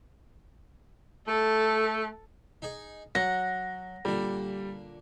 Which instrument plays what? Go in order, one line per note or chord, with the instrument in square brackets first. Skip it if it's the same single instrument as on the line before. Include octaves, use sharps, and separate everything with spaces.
[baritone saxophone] A3 [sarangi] A4
[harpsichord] D#4 G#4
[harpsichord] F#3 [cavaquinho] F#5 [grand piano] A#6
[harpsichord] A#2 D3 [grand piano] G3